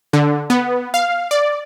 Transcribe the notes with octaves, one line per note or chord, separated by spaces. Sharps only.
D3
B3
F5
D5